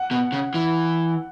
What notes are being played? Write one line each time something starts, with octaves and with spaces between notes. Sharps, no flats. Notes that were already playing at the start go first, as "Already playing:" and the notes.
Already playing: F#5
B2
C#3
E3